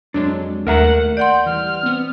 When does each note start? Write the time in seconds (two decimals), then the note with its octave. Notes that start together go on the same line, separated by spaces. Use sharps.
0.14 F2 F#3 G#3 D4
0.67 D#2 A3 A#4 E5 F#5 A#5
1.17 D5 F#5 C6 G6
1.46 E3 G3 F6
1.83 B3 C4